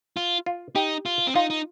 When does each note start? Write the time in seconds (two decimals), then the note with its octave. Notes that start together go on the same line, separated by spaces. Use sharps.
0.17 F4
0.46 F4
0.75 D#4 G4
1.06 F4
1.27 C4
1.35 D#4 F4
1.50 D#4